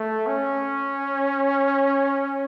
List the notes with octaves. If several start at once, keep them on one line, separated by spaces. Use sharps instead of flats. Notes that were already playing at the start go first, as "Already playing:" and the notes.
Already playing: A3
C#4